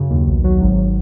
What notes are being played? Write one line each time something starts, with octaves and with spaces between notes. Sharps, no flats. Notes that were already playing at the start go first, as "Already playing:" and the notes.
Already playing: F#2 C#3
D#2
B1
F#3
G#1